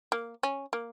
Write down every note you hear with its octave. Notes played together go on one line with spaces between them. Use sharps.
A#3
C#4
A#3